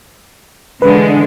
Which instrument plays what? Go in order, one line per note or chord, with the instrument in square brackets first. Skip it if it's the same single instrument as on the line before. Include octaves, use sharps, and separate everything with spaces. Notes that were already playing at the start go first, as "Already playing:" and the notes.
[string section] D3 E3 G#3 [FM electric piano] B4